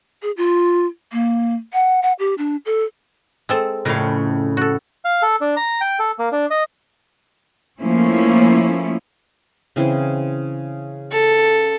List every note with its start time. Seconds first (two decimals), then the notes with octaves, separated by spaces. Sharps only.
0.22 G#4
0.37 F4
1.12 A#3
1.73 F#5
2.02 F#5
2.19 G4
2.38 D4
2.66 A4
3.49 G#3 C4 A4
3.85 F2 A2 C#3 A#4 F5
4.57 F#4 A4
5.05 F5
5.22 A4
5.41 D4
5.57 A#5
5.81 G5
5.99 A4
6.19 A#3
6.32 D4
6.51 D#5
7.81 F3 A3 A#3 C#4 E4
9.76 C#3 E3 C4
11.11 A4